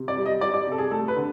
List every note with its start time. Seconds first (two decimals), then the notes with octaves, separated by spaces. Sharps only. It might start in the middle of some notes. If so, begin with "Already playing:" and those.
Already playing: C3
0.08 D5
0.17 G3
0.26 D#5
0.41 G3 D5
0.54 D5
0.67 C3 A4
0.78 G#4
0.91 A3 A4
1.08 B4
1.16 D3